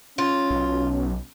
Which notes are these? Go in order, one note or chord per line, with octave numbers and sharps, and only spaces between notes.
C#4 F4
B1